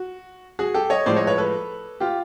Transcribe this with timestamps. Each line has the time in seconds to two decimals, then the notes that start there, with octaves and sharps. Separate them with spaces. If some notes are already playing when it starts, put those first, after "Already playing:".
Already playing: F#4
0.59 F#4 G#4
0.74 G4 A4
0.90 C#5 D#5
1.06 A2 F3 G#3 C5 D5
1.16 C#5 D#5
1.27 B4 C#5
1.38 A4 B4
2.00 F4 G4